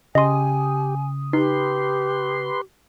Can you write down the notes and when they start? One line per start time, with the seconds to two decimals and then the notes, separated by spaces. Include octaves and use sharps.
0.15 C#3 G4 D#5 G#5 C6 D#6
1.33 D#4 G4 B4 C6